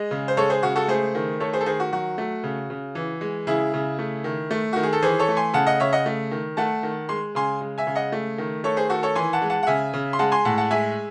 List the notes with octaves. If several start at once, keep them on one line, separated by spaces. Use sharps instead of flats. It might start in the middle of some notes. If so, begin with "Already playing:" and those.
Already playing: G#3 D#5
C#3
C5
G#3 A4 C#5
G#4 C5
C#3 F#4
F#4 A4
A3 G#4 C5
D#3
A3 A4 C#5
G#4 C5
A4
D#3 G#4 C5
F#4
F#3 F#4
A3
C#3
C#3
E3
G#3
C#3 E4 G#4
C#3
A3
D#3
A3
D#3 F#4
G#4
A4
E3 G#4 C5
A4 C#5
A3
G#5 C6
C#3 F#5 A5
D#5 F#5
C#3 C#5 E5
D#5 F#5
A3
D#3
A3 F#5 A5
D#3
G#3 C6
C#3 G#5 C6
G#3
E5 G#5
C#3
D#5 F#5
A3
D#3
A3 A4 C#5
G#4 C5
D#3 F#4 A4
A4 C#5
E3 G#5 C6
F#5 A5
G#3
F#5 A5
F#5
C#3 E5 G#5
C#3
C6
G#3 F#5 A5
G#5 C6
A2 F#5 A5
F#5 A5
G#3 E5 G#5